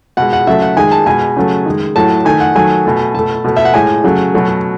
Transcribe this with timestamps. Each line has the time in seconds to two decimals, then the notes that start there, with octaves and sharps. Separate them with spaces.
0.17 B2 G#3 F#5
0.33 F#5
0.47 C#3 F#3 A3 E5
0.62 F#5
0.77 D#3 G#3 G#5
0.92 A5
1.06 B2 G#3 G#5
1.37 C#3 F#3 A3
1.66 D#3 G#3
1.96 A2 F#3 A3 A5
2.25 D#3 A3 G#5
2.40 F#5
2.55 D#3 F#3 A3 G#5
2.85 B2 A3
3.14 B2 A3 A5
3.45 B2 A3
3.57 E5
3.65 F#5
3.74 A2 G#3 G#5
4.04 C#3 F#3 A3
4.34 B2 F#3 A3